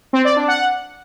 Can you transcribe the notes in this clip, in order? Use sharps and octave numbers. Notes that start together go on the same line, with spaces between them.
C4
D5
D4
F#5